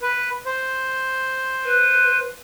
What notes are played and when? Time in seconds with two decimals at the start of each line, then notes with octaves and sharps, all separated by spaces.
0.02 B4
0.46 C5
1.65 B4